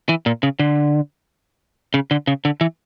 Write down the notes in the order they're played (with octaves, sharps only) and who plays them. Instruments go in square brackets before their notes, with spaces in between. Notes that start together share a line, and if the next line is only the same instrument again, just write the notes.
[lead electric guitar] E3
A#2
C#3
D3
C#3
D3
C#3
D3
E3